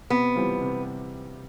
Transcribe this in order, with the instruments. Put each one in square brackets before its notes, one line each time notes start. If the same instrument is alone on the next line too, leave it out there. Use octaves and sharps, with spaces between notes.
[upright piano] C3 [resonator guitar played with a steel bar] B3
[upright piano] E3 G3 C4 F4
C3